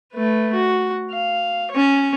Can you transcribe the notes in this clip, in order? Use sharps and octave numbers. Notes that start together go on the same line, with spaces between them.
A3 B4
F#4
F5
C#4 C#5